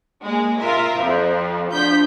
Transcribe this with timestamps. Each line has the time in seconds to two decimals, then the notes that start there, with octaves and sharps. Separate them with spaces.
0.25 G#3 A#3
0.58 F4 A#4 E5
1.00 F2 F3
1.71 D2 F3 G6 B6